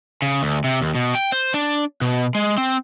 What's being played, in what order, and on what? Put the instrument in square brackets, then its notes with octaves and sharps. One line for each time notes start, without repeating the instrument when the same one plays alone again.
[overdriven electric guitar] C#3
D2
C3
D#2
B2
G5
C5
D4
B2
G#3
C4